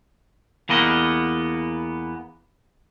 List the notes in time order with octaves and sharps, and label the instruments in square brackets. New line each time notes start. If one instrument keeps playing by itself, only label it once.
[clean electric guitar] E2 A#3 B3 D#5